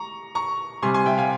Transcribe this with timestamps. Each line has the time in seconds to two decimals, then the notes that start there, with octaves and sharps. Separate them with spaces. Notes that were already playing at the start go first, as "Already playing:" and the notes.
Already playing: A#5 C#6
0.35 A#5 C#6
0.82 C3 G3 G#5 C6
0.94 G#5 C6
1.06 E5 G5
1.18 F5 G#5